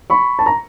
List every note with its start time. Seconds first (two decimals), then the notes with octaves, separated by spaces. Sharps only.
0.10 B5 C#6
0.39 A5
0.46 A#5